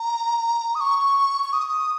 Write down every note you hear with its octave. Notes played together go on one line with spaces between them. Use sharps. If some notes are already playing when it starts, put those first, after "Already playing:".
Already playing: A#5
D#6
C#6
C#6
D#6